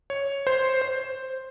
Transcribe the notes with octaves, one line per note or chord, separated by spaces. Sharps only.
C#5
C5
C5